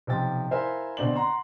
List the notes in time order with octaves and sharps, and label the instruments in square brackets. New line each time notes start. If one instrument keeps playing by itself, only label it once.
[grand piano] B1 C3 F3 G5 A6
E4 A#4 C5 E5 F5 G#5
B2 D3 C4 D5 F#7
F#5 A#5 C6